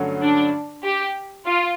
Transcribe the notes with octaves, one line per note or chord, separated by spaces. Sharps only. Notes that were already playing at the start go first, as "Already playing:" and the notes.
Already playing: G2 D3 F#3 A3 C#4
D4
G4
F4